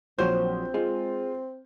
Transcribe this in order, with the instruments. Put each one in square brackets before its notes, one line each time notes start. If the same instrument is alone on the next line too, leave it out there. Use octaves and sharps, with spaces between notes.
[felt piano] A#1 G6 [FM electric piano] F3 F#3 F#4 [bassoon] C4 [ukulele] C5
[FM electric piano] G#3 [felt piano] F4